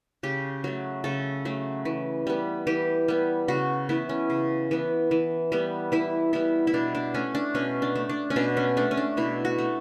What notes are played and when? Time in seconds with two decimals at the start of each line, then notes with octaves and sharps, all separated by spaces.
0.23 C#3 G4
0.64 F#3 A3
1.04 C#3 A4
1.45 F#3 A3
1.85 E3
2.27 G3 B3
2.67 E3 G4
3.08 G3 B3
3.48 C#3 F#4
3.89 E3 B3 E4
4.09 C#4
4.30 C#3
4.71 E3 B3
5.11 E3
5.52 G3 B3
5.92 E3 E4
6.33 G3 B3 E4
6.67 E4
6.74 B2 D4
6.95 D4
7.14 A3 C#4
7.35 D4
7.55 B2 C#4
7.82 D4
7.95 A3
8.09 D4
8.30 C#4
8.36 B2 D4
8.57 C#4
8.77 A3 D4
8.91 C#4
8.97 D4
9.17 B2 E4
9.45 F#4
9.58 A3